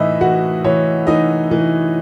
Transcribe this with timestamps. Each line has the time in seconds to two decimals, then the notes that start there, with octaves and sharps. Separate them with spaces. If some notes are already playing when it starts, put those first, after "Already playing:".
Already playing: A2 E3 D#4 E4 D#5 E5
0.21 E3 F#4 F#5
0.64 E3 C#5
1.07 E3 D#4 D#5
1.51 E3